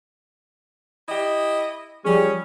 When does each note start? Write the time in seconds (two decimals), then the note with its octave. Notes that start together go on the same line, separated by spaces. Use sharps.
1.09 E4 G4 D#5
2.05 F3 G3 C#4 G#4